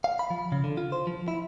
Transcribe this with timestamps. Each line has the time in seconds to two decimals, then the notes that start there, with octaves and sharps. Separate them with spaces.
0.04 F5
0.19 B5
0.30 F3
0.52 C#3
0.64 D3
0.77 F4
0.92 C5
1.07 F3
1.28 E4